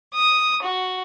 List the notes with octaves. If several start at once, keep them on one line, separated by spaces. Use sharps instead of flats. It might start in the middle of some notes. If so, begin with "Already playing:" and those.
D#6
F#4